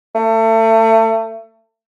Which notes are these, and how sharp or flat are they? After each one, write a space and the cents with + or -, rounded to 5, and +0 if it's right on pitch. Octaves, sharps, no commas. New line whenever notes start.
A3 +30